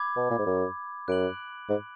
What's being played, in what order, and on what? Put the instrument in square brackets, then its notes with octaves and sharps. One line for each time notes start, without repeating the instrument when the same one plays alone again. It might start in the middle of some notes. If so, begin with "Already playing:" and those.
Already playing: [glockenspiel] B5 D6 G#6
[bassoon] B2
A#2
G#2
F#2
[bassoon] F#2 [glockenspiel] F#6 D7 F#7
[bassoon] G#2